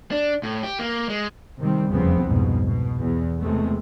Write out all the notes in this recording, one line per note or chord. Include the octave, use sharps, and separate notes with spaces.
D4
A2
G4
A#3
G#3
C3 D#3 G3 C4
F1 E2 C#3 F3 B3 C4
C2 F2 G#2 B2
B2
E2
E2 C3 G#3 A3